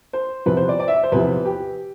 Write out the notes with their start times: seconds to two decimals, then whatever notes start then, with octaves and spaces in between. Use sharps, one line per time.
0.13 C5
0.46 E2 C3 F3 B4
0.57 C5
0.69 D5
0.80 D5
0.88 E5
1.03 C5
1.12 E2 C3 F3 B4
1.45 G4